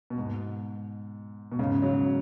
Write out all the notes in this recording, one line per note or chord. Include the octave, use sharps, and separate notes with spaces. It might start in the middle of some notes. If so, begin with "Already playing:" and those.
B2
G#2
B2
G#2 C#3
C#3 F#3